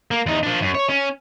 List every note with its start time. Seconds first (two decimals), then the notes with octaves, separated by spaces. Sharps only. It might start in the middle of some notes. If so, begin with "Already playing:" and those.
0.11 A#3
0.26 E2 D#4
0.43 F3 D4
0.61 F#2
0.75 C#5
0.89 C#4